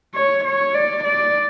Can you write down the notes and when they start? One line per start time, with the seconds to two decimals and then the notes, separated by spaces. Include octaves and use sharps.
0.15 C#5
0.45 C#5
0.75 D5
1.04 D5